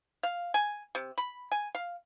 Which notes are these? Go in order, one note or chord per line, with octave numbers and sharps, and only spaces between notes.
F5
G#5
C3
B5
G#5
F5